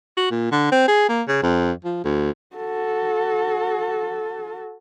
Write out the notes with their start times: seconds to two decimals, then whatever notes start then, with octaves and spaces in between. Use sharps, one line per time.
0.17 F#4
0.31 A#2
0.52 D3
0.72 C4
0.88 G#4
1.09 A#3
1.28 C#3
1.42 F2
1.84 F3
2.04 D2
2.56 F#4 A4